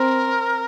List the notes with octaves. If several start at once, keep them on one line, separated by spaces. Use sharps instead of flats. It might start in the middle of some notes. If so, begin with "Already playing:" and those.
Already playing: C4 A#4